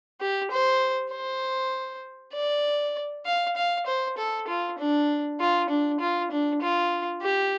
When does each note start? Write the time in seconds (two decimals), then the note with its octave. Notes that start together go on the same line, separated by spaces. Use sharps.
0.21 G4
0.51 C5
1.12 C5
2.34 D5
3.26 F5
3.57 F5
3.86 C5
4.18 A4
4.48 F4
4.78 D4
5.40 F4
5.70 D4
6.00 F4
6.31 D4
6.62 F4
7.22 G4